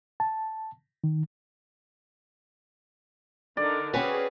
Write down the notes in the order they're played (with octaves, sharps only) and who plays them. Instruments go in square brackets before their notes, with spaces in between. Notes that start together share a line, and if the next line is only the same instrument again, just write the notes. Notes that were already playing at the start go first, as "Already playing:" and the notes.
[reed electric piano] A5
D#3
[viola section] D3 D#4 A#4 [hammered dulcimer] D5
[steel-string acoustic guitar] C4 B4 [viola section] C#4 G#4 [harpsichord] F#4 C#5 G#5